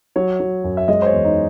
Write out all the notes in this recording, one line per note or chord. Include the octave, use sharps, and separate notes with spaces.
F#3 C#5
F#3
F#2
E5
G#3 D#5
C5
C#5
E2
D#4